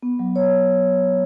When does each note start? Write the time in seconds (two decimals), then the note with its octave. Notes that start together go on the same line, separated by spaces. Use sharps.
0.03 B3
0.19 F#3
0.36 C#5